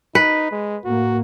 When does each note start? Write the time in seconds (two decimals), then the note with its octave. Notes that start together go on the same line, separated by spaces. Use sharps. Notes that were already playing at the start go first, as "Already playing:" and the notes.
0.15 D#4 B4
0.51 G#3
0.85 A2 A#3 F#4